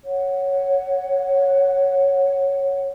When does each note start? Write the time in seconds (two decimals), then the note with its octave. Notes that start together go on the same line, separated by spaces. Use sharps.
0.04 C#5 F#5